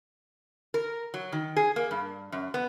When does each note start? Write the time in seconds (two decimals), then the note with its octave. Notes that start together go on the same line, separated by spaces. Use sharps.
0.74 A#4
1.14 F#3
1.32 D#3
1.56 G#4
1.76 A#3
1.91 G2
2.32 F#2
2.54 B3